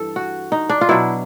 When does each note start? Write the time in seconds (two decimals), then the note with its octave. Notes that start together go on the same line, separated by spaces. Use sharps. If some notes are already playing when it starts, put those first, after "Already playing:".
Already playing: G2 E3 A4
0.16 F#4
0.52 D#4
0.69 D4
0.81 F4
0.89 B2 F#3 E4